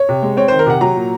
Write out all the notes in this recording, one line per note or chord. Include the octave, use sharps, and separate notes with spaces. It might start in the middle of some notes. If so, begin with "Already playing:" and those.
Already playing: C#5
C3
G#3
C4 C#5
D#3 C5
A#4
C3 F#5
F#3 A#5
A#2